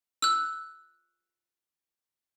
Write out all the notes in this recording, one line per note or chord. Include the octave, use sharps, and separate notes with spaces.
E6 F#6